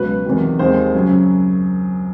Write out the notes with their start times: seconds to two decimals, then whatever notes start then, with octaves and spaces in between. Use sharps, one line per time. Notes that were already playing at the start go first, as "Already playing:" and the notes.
Already playing: C#2 B2 F#3 B4
0.25 E2 C3 D#3 F#3
0.59 D#2 D#3 G#3 C4 C5
0.94 F#2 C#3 F#3